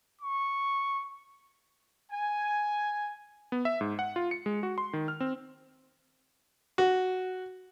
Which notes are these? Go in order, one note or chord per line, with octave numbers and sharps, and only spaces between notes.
C#6
G#5
B3
E5
G#2
F#5
F4
C#7
G#3
F#4
C6
D#3
F6
C4
F#4